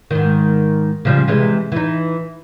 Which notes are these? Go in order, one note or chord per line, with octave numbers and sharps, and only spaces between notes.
G#2 D#3
C#3 F3 G3
C3 E3 G#3
E3 D#4